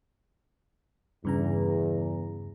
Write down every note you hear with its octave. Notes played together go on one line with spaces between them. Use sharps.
E2 G2 C#3 A#5